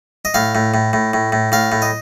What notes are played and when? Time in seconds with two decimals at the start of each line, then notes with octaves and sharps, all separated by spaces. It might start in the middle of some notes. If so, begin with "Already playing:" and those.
0.25 D#5
0.34 A2 F5
0.55 A2
0.74 A2
0.93 A2
1.14 A2
1.32 A2
1.52 A2 F5
1.72 A2
1.82 D#5